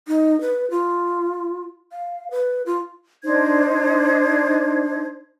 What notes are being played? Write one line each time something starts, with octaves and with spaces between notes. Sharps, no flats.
D#4
B4
F4
F5
B4
F4
D4 D#4 C5 G#6